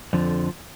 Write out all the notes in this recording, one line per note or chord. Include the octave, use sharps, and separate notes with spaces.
F2 D3 F3